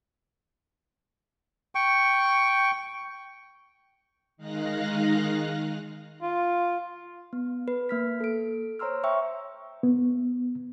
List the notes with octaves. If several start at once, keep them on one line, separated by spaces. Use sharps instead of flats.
G5 C#6
D#3 G#3 D#4 F5 F#6 A#6
F4
B3
B4
A#3 F6 B6
A4 D7
C5 C#5 A#5 C6 E6 F6
E5 G5 C#6 E6
B3